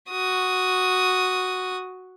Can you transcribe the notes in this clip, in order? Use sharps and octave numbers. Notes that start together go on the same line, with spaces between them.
F#4 D#6